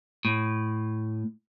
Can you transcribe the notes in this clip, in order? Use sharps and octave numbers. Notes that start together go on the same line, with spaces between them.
A2